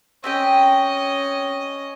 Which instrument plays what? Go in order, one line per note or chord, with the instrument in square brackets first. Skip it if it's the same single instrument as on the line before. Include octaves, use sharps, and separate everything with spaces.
[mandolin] C4 G4 G5 [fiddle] C#4 D#5